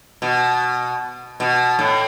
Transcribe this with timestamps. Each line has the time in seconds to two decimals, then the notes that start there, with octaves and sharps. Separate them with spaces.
0.22 B2
1.40 B2
1.79 A2